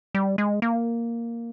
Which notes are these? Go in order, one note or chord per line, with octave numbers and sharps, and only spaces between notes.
G3
G#3
A#3